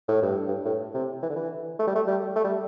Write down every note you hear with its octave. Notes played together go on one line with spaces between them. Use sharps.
A2
G2
G2
A2
C3
E3
D3
E3
A3
G3
A3
G3
A3
G3